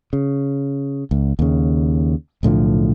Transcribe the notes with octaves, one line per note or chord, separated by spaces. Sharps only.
C#3
C#2
D#2 C#3
B1 A2 D3 F3